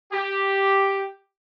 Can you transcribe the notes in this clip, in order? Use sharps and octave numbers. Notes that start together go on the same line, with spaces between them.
G4